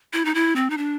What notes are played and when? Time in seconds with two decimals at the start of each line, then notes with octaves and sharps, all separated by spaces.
0.13 E4
0.25 D#4
0.35 E4
0.56 C4
0.70 D#4
0.78 D4